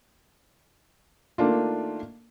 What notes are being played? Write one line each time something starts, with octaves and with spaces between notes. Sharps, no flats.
D#3 A3 A#3 D4 F4